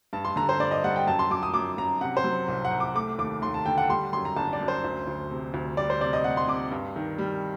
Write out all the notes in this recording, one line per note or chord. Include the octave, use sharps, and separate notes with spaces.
G2 A5
C6
D3 A#5
C5
G2 D5
D#5
G3 F#5
G5
F#2 A5
C6
F#2 D6
D#6
F#2 D6
F#2 A#5
C3 F#5
C5
F#3
C2
F#5
C2
D6
A3 D6
D#2 D6
D#2 C6
A5
D3 G5
F#5
G3 C6
F#2 C6
A#5
G1 A5
D5
F#2
C5
D2
D2
C3
D2
G3 D5
C5
C3 D5
D#5
C3 F#5
C6
C3 D6
G2
D#3
G3